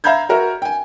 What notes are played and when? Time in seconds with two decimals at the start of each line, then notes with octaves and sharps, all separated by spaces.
0.04 E5 F5 A#5 B5 G6 G#6
0.29 F#4 A#4 E5
0.62 G5 G#5